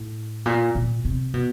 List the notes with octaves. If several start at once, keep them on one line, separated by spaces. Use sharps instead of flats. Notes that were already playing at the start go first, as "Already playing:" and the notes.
Already playing: A2
A#2
A#2
C3
B2